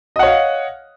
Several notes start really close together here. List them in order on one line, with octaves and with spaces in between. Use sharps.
D#5 F#5 C#5 F5